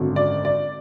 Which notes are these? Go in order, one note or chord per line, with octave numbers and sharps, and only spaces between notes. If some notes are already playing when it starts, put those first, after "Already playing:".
Already playing: G#1 F#2 D3
D5
D5